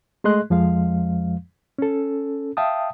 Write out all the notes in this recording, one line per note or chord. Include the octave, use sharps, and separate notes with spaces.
G#3 A3 G#4 D#5 C6 F#6
F2 F3 G#3 F5
C#4 A4
E5 F5 G5 A5 D#6